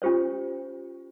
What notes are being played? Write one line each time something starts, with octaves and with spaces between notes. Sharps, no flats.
C#4 F4 G4 C5 C#5